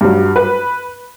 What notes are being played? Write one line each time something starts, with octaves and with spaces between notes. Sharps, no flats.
G2 F#3
B4